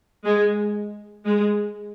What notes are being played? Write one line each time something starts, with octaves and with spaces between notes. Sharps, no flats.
G#3
G#3